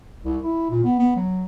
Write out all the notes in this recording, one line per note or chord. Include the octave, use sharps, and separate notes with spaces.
C2
E4
A#2
B3
B3
F#3